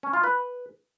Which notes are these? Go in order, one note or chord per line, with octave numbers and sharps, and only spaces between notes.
C#4
F4
B4